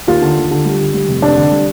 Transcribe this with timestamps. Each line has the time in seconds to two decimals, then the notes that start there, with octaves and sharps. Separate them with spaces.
0.08 D#2 F4
0.22 D3
0.37 D#2
0.51 D3
0.65 G3
0.80 D3
0.94 G3
1.08 F1
1.22 F1 D4
1.37 D3
1.52 G3